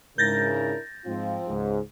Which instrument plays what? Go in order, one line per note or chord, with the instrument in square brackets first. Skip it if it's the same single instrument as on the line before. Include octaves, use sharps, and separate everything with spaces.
[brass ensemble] G#2 C#3 [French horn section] D4 E4 A#4 [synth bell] G6 A6 A#6
[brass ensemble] G#2 F4 [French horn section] F3 C4
[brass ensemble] C#2 G#2